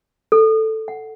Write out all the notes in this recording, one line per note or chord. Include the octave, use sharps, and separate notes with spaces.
A4
F#5